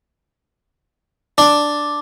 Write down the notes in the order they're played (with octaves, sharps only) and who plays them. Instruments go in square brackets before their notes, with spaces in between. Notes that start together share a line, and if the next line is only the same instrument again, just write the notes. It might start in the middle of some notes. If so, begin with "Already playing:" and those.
[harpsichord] D4